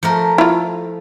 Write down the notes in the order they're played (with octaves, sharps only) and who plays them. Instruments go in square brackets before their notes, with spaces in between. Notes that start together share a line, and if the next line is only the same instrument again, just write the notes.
[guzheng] F3 A3 A#4
[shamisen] E4 F4